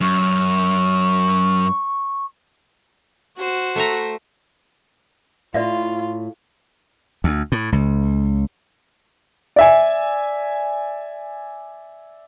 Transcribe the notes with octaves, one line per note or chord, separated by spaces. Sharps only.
F#2 C#6
F#4 C5
A3 E5 A#5
A2 F4 D5 E5 F5
D2
A2
C#2
D5 E5 G#5